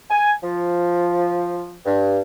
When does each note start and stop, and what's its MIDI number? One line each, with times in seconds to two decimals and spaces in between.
0.10 0.32 80
0.43 1.74 53
1.86 2.20 43